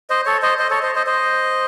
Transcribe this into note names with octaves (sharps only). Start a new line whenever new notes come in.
C5 D#5
A4 C#5
C5 D#5
C5 D#5
A4 C#5
C5 D#5
C5 D#5
C5 D#5